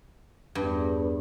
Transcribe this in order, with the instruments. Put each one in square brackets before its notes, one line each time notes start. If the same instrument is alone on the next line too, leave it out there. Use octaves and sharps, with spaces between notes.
[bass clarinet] E2 [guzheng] G2